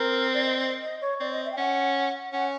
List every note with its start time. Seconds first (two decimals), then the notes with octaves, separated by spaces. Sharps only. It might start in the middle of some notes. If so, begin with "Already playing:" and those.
Already playing: C4 A#4
0.34 D5
0.45 D#5
0.82 D#5
1.01 C#5
1.20 C4 D5
1.32 D#5
1.45 E5
1.52 G5
1.57 C#4 F#5
2.33 C#4 F#5